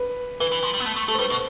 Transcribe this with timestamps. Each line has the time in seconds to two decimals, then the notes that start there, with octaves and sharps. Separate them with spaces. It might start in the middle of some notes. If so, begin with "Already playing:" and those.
Already playing: B4
0.40 E3 B4
0.52 E3
0.64 F3
0.74 G3
0.80 B3
0.86 A3
0.96 A3
1.08 A3 A4
1.14 C5
1.19 G3 B4
1.30 B2 C5